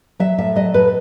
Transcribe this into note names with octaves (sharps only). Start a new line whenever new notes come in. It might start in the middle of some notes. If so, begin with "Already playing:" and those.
F#3 E5
A2 E5
F#3 D#5
A2 B4